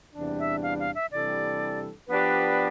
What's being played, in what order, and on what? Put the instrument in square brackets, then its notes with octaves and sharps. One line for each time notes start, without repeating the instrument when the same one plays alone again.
[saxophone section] E2 C3 G3 D4
[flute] E5
F5
F5
E5
[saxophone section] C3 E3 G3 D4 A4 [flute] D5
[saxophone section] F3 B3 D4 G4 D5 [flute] B4